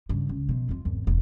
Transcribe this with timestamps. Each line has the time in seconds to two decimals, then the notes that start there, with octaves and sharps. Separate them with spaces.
0.09 G2 C#3
0.29 C#2
0.49 B2 F3
0.69 F2 F4
0.85 G#1 E2
1.07 E1 D#2